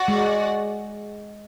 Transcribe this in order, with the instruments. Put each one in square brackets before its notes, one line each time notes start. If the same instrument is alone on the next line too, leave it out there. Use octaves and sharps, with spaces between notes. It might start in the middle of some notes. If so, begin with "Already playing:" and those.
Already playing: [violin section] F#4 D5 F#5
[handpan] G#3